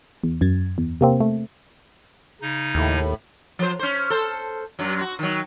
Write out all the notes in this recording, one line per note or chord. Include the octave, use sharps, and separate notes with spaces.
E2
F#2 G#6 A6
E2
C3 A#3 C4
A3
C#3 D#4
D#2 A2
F3 C5
C#4 C5
A4 C5
F#2 F#3
F#4
D#3 F#3